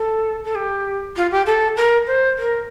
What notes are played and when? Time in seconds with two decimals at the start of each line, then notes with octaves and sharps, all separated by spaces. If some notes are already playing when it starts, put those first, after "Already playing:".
Already playing: A4
0.44 A4
0.55 G4
1.16 F4
1.31 G4
1.46 A4
1.76 A#4
2.06 C5
2.38 A#4